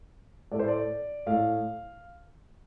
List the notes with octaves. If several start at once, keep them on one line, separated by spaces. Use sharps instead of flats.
A2 A3 D5
C5
D5
A2 A3 F5